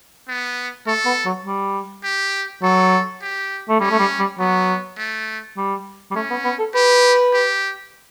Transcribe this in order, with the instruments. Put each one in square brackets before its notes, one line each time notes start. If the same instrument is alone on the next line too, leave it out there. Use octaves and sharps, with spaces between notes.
[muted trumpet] B3
[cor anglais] A3 [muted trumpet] A4
[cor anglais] B3
F#3
G3
[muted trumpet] G4
[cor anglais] F#3 [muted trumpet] A4
[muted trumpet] G4
[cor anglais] A3
[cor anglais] G3 [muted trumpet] C#4
[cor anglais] A3
G3
G3
[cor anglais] F#3 [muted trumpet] B3
[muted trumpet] A3
[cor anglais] G3
G3
[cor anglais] A3 [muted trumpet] C#4
[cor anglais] B3
B3
A4
[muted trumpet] G4 [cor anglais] B4
[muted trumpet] G4